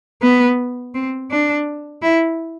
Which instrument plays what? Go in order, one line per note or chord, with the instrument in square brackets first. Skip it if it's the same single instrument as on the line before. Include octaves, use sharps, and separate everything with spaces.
[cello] B3
C4
D4
E4